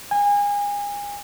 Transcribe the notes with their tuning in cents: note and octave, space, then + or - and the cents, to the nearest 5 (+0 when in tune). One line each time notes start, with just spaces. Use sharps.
G#5 -30